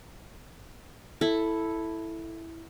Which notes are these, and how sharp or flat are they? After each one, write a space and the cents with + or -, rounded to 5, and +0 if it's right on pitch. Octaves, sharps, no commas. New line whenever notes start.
E4 +0 A4 +0